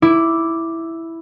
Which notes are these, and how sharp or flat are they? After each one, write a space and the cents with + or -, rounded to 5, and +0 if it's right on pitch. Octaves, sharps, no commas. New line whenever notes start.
E4 +0 D6 +0